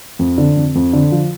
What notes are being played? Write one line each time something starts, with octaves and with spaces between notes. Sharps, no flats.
F2
D3
F2
F2
D3
F3